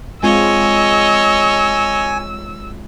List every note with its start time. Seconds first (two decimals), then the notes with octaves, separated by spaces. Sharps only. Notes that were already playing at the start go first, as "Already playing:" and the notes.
0.23 G#3 C4 F4 C#5 D#5 G#5 E6